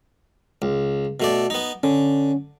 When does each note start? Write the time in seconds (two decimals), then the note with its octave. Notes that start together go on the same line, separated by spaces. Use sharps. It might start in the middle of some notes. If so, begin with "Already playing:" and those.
0.62 C#2
1.20 B2 A3 D5
1.50 B3 D#4
1.83 D3 C#4